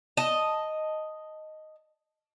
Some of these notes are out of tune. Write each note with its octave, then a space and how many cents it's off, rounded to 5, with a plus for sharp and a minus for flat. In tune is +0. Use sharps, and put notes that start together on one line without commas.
D#5 +0 A5 +0